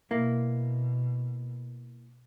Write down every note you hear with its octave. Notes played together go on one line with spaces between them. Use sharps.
B2 A#3 E4